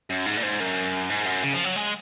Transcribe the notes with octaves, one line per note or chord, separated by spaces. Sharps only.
F#2
G#2
A#2
G#2
F#2
G#2
F#2
C#3
F3
F#3
G#3